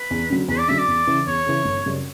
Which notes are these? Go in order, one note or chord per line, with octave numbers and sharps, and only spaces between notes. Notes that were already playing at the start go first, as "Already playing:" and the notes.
Already playing: B4
E2
D3 F#3
E2 B4
D5
D3 F#3 E5
D5
E2
C#3 E3
E2 C#5
C#3 E3
G1
F#2 C#3 G3